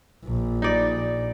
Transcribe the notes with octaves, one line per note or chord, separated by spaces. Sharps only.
A#1
D#4 D5